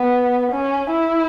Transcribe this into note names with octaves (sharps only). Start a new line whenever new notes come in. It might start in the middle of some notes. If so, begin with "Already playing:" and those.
Already playing: B3
C#4
E4